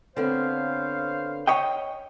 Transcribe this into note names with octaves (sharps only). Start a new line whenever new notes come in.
D3 B3 C4 C5 C#5 F5
C#5 D#5 G5